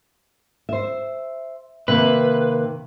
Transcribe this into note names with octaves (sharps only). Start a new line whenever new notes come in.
C5 E5
C3 D#3 A#3 B4